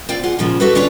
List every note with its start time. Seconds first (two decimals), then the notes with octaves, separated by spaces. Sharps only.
0.09 C4 F4 D5 F5 G5
0.23 F4 G#4 F#5
0.39 A#2 C#3 F3 G#3
0.60 A3 E4 F#4 G4 A4 B4
0.75 D3 C#4 D4 F4 B4 C#5